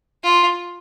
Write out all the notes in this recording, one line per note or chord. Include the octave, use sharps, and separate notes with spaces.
F4